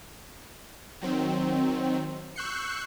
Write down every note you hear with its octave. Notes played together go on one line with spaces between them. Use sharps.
D#3 F#3 C4
C#6 E6 F#6 G6 C7 C#7